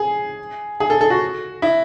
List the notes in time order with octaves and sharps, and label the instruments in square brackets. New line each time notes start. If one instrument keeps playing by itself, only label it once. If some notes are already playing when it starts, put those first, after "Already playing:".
Already playing: [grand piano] G#4
G#4
A4
A4
F#4
E4